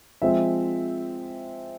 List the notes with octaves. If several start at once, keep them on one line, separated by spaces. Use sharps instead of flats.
F3 G#3 C4 E5